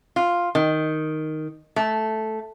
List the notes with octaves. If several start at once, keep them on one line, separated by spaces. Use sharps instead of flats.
F4
D#3
A3